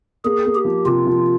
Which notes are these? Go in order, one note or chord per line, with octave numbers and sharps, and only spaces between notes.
A#3 G#4
A#3
G4
F3
C3 F4
F3